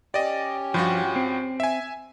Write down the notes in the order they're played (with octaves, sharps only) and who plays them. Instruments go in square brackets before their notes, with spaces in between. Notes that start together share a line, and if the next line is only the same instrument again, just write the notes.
[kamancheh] C#4 G4 [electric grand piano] D5 D#5
[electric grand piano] G2 F4 F#4 [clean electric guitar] F3
[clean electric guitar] C4
[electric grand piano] E5 G#5